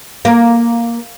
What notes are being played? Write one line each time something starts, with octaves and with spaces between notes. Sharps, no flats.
A#3